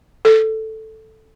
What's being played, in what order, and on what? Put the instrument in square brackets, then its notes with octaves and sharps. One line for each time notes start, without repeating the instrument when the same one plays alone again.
[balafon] A4